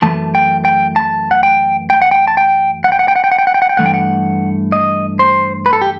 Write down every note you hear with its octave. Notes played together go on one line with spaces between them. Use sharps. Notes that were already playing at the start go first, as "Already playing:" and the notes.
F#2 E3 A3 A5
G5
G5
A5
F#5
G5
G5
F#5
G5
A5
G5
F#5
G5
F#5
G5
F#5
G5
F#5
G5
F#5
G5
F#5
G5
G2 E3 A3 F#5
G5
F#5
D#5
C5
B4
A4
G4